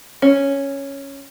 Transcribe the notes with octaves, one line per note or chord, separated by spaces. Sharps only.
C#4